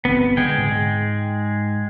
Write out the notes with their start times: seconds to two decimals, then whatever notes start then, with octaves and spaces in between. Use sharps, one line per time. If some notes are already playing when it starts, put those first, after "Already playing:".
0.05 G1 C3 B3 C4
0.37 D3 G#3 G#4 G5
0.58 G#2